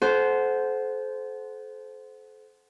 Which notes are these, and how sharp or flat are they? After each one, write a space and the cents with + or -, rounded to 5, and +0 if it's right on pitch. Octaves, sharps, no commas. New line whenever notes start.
A4 -35 C5 -10 F#5 +0